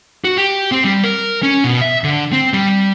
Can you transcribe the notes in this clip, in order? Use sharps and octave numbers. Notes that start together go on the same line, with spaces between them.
F#4
G4
C4
G3
A#4
C#4
B2
E5
D3
C4
G3